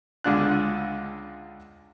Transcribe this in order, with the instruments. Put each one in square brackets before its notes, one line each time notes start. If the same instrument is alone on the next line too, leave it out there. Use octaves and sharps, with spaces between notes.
[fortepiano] C#2 D3 G#3 D4 F4 F#6